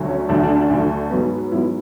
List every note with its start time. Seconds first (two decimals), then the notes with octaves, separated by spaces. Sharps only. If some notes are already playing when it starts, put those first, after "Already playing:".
Already playing: D2 D3 F#3
0.09 C#4
0.29 D2 D3 F#3 A3 D4
0.43 D4
0.56 D4
0.70 D2 D3 F#3 A3
1.10 G#2 F#3 B3
1.52 G#2 F#3 B3 E4